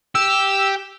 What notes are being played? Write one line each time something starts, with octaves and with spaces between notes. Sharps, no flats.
G4 E6